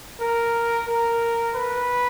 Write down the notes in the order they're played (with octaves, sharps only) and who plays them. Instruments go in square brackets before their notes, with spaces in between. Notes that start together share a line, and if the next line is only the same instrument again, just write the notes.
[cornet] A#4
A#4
B4